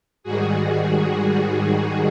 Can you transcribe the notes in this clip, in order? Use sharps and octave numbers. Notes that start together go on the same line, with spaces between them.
G#2 D#3 G3 F#4 G#4